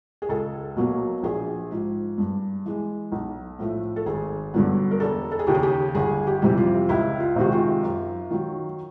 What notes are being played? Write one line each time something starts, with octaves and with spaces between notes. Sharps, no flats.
G#4
C#2 A4
B2 F#3 A#3
A#1 G#4
G#2 F3
G2
E3 G#3
B1
A2 F3 A3
A4
G#1 G#4
G2 D3 F#3 B3
A#4
E1 A4
A4
G#4
D#2 C#3 G4
G#4
G4
G1 G#4
G4
F2 C3 E3 G3
F4
C#2 E4
F4
C3 D#3 G#3 F#4
F4
F#2
D#3 F#3